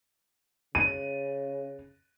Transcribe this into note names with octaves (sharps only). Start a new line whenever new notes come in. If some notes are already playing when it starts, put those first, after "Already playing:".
C#3 D#7